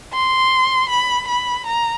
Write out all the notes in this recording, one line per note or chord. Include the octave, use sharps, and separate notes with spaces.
C6
B5
B5
A#5